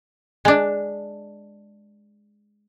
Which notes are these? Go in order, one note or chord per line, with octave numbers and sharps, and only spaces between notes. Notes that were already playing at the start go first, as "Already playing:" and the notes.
G#3 D4